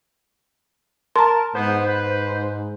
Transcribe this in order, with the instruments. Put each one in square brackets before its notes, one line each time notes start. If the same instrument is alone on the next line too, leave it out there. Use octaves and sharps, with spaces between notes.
[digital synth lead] A#4 [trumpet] A5 [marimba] A#5 C6
[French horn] G#2 [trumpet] B3 [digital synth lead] C5
[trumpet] B4